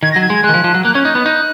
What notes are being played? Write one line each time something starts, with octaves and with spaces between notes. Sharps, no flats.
D#3 G#6
A#6
F#3
G#6
G#3
G#3 F#6
D#3
F3
F3
F#3
A#3 F#6
C#4 G#6
D#4 F#6
B3
D#4